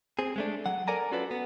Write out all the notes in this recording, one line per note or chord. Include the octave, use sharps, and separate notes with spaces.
C4 G#4
G#3 A3 D4
F#3 F#5
A4 A#4 D5 G#5 A#5
C#4 F4 F#4 A4 B4 D5
B3